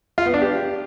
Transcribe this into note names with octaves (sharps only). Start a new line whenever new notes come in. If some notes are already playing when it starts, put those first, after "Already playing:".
F4
B3
D4
G4